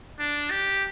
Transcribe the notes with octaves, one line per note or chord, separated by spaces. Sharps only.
D4
G4